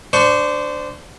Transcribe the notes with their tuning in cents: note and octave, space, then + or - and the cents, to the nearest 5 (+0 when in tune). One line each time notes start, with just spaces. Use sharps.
D4 +0 C5 -20 C#6 +0